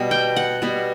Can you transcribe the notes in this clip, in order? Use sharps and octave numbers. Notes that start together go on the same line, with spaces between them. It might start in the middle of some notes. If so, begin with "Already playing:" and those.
Already playing: B2 G3 B3
G5
F#5
B2 G3 B3